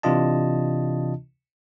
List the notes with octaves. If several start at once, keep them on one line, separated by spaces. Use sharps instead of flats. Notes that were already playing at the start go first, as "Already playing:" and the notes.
C3 E3 D4 F4 D#5 A5